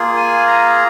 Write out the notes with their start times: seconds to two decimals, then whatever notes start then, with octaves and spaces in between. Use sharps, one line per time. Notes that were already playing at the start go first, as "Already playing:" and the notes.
Already playing: A#3 F4 G#4
0.17 G#5
0.47 A#5